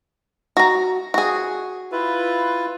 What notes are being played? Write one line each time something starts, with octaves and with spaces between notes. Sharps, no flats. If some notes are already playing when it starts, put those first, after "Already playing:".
F#4 A#5
F#4 G#4
E4 F4 B4